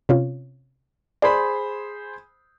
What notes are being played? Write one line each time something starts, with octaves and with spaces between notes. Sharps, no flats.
C3 C#4 F4
G#4 C5 D5 B5